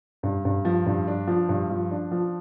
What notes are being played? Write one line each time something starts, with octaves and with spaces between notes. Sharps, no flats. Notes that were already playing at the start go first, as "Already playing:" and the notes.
G2
G2
F3
G2
D4
F3
G2
F3
D4
F3